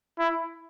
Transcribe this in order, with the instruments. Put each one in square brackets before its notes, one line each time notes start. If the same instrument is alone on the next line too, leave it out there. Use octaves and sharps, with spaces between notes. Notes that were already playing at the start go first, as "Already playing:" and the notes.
[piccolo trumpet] E4